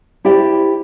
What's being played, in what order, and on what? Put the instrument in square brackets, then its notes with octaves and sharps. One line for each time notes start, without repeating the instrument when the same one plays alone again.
[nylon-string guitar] E4 G4 C5 D5 G5